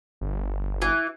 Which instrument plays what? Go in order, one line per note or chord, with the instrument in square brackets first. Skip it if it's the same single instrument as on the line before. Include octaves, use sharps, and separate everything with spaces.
[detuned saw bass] G1
[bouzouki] E3